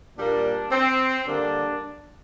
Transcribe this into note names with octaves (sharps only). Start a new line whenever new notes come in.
A#2 G3 A#3 D4
C4
D3 G3 A#3 D4